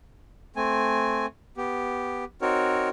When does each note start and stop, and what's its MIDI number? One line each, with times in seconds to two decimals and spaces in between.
0.56 1.26 57
0.56 1.26 60
0.56 1.26 80
1.57 2.24 59
1.57 2.24 67
2.42 2.89 60
2.42 2.89 63
2.42 2.89 66
2.42 2.89 70
2.42 2.89 73